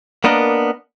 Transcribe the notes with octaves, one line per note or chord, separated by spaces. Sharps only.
A#3 B3 D4 A#4 D#5